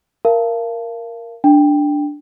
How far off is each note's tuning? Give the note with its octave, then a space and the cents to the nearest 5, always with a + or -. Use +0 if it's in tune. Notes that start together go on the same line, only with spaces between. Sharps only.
A#4 +0 F5 -35 A5 +0
D4 +0 G5 +10